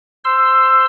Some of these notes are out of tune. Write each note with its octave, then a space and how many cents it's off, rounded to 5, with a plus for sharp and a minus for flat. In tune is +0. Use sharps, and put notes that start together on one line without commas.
C5 +0 C6 +0 E6 +15